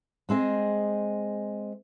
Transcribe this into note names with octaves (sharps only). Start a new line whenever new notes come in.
G#3 C4 G#4 D#5